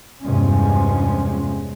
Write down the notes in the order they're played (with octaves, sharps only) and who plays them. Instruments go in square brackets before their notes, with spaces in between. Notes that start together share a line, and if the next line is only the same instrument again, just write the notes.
[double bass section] E2 G2 C3 F3 G#3 C#4